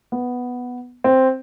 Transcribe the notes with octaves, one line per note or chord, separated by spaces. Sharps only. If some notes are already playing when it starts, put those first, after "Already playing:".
B3
C4